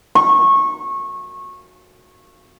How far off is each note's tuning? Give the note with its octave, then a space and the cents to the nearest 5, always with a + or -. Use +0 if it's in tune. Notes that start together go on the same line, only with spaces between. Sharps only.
C#6 -20